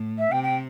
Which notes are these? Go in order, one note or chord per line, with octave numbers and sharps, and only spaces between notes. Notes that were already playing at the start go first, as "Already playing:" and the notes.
Already playing: A2
E5
C3 G5
G5